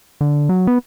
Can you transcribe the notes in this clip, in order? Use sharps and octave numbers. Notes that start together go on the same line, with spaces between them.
D3
F#3
B3